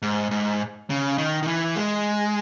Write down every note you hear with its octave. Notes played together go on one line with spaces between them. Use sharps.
G#2
G#2
C#3
D#3
D#3
E3
G#3